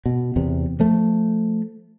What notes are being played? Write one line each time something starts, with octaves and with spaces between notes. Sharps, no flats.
B2
E2 C3
F3 A3